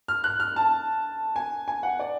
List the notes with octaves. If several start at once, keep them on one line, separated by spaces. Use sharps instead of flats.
F6
F#6
F6
A5
G#5
G#5
F#5
D5